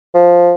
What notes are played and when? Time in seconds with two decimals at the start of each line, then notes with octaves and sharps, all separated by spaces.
0.14 F3